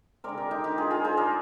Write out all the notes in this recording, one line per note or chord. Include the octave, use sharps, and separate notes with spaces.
D3 G#3 C4 A#4 D5
G4 A#4
D#4 G4
D#4 G4
F4 G#4
F4 G#4
G#4 C5
A#4 D5